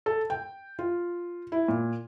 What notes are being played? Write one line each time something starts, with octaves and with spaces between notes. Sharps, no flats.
A4
G5
F4
E4
A#2